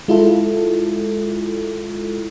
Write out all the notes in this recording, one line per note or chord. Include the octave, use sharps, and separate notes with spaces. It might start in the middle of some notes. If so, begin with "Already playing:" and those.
G#3 E4 F4 A4